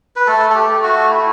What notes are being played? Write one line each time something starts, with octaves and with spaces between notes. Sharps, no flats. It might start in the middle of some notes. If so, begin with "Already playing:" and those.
B4
A3 A4
A4
G4
A3
F#4
E4